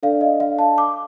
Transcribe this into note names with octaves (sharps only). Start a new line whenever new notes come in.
D4 A4 D5 F5
D#5
F5
A5
D6